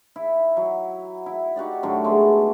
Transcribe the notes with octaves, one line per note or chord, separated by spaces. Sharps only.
E4
F#3
E4
D#4 F#4 G4 D5
A2 D3 F#3
G#3 A3 B3